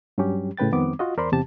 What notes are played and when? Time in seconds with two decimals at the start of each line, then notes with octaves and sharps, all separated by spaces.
0.18 G2 F#3 G3 C#4 G4
0.57 A2 C#3 B4 G5 A6
0.72 F2 D#3 G3 B3 C4 D6
0.99 F4 F#4 D#5
1.17 E2 A#4 C5 D5 B5 C6
1.32 E2 C3 G4 A5